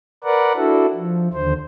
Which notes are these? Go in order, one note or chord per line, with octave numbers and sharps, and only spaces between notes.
A#4 B4 D5 F#5
D4 E4 F#4 A4
F3
D#2 D3 C5